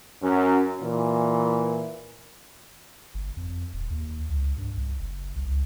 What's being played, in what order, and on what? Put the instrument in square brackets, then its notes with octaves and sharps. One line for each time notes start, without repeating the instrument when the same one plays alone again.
[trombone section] F#2 C#4
A#2 E3
[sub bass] G1
F2
D#1
D#2
C#2
G2
C2
F#1
C2
C#2